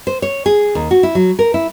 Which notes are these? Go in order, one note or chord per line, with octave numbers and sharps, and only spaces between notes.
C5
C#5
G#4
D#2
F#4
E4
F#3
A#4
E4